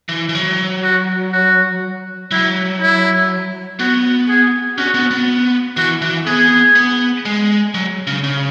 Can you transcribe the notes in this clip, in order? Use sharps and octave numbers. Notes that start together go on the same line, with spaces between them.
E3
E3
F#3
F#4
F#4
F#3 E4
E4
B3 F#4
G#4
C#4 F#4
B3
B3
E3 F#4
E3
B3 G#4
B3
G#3
F#3
C#3
C#3